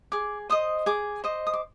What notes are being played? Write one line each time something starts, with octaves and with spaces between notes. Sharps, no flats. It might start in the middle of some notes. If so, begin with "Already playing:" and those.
G#4 D6
C5 D#5 D#6
G#4 D6
C5 D#5
D#6
D6